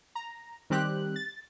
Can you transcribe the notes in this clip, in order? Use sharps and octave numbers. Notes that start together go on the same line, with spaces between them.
A#5
D#3 G3 C4 G4 F#6
A6